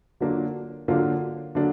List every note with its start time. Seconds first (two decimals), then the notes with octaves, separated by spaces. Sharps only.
0.20 D3 F#3 A#3 D4 F4
0.88 D3 F#3 A#3 D4 F4
1.55 D3 F#3 A#3 D4